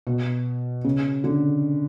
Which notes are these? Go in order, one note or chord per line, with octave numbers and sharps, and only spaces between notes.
B2
C#3
D3